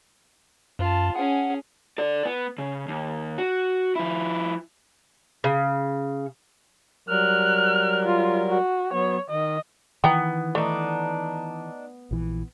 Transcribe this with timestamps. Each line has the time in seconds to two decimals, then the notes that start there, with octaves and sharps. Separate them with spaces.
0.79 F#2 F4 A5
1.16 C#4 G#4 F#5
1.98 A4 D5
2.25 B3
2.58 C#3
2.88 D#2
3.38 F#4
3.96 F3 E4
5.44 C#3
7.09 F#3 G3 A#4 F6 F#6
8.05 F4
8.49 F#4
8.93 F#3 B3 C#5
9.30 D#3 D#5
10.04 D#3 E3 B3 G5 A#5
10.55 A3 D4 D#4
12.11 A#1 E3